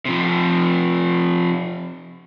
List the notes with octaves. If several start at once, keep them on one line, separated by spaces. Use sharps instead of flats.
C3 F3